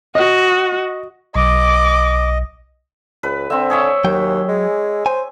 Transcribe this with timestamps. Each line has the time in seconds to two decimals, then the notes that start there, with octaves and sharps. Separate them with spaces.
0.15 F#4 D#5
1.36 B1 D#5 D6
3.23 C#2 B4
3.50 D3 C4 E5
3.70 G#4 C#5 E5
4.04 D#2 F#3 G5
4.48 G#3
5.06 C5 G#5